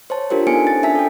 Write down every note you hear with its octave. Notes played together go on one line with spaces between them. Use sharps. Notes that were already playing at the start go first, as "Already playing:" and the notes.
C5 C#5 A5
D4 F4 G4 A#4 C5
B3 D#4 A4 G#5 C#7 D7
C#4 A6
D4 E5 G#5 A5 B6
A4 G5